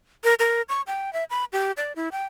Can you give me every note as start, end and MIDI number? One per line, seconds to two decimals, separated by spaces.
0.24 0.34 70
0.39 0.62 70
0.69 0.82 85
0.87 1.12 79
1.13 1.24 76
1.30 1.45 83
1.53 1.72 67
1.77 1.93 74
1.96 2.09 64
2.12 2.26 79